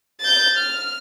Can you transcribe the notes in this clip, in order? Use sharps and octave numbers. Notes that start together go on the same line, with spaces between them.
G6 A6
F6